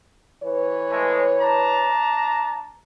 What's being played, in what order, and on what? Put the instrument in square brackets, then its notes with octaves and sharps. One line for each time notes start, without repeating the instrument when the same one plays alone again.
[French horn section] E3 B4 C#5
[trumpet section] G#3 A3
D4 A5 A#5